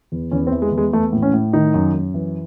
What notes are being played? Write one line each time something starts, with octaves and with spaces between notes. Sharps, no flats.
E2
E2 C#4
C4
E3
G#3
E2
G#3
E3 A3
A2
C#4
A2
D#3 D#4
F#2
F#2
E3